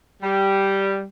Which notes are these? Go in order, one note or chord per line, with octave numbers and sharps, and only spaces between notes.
G3